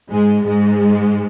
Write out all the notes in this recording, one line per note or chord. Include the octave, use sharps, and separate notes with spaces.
G#2 G#3
G#2 G#3